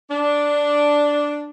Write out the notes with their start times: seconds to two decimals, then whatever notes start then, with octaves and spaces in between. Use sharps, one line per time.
0.10 D4